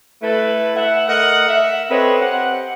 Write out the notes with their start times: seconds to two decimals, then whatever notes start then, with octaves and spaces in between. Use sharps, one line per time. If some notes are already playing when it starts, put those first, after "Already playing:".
0.22 A3 E4 A4 B4
0.76 E5 F#5
1.08 A3 A#4 D#5 F#5
1.48 E5
1.90 C4 A4 B4 C#5 D#5
2.21 C4 G4 F#5